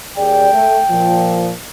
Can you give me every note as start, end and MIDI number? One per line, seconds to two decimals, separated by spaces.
0.17 0.49 39
0.17 0.49 68
0.17 0.49 74
0.17 1.43 79
0.53 0.78 57
0.90 1.52 46
0.90 1.52 53